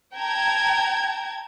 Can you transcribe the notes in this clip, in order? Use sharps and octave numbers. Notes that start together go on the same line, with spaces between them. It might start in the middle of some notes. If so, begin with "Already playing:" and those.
G5 A5 A#5 G#6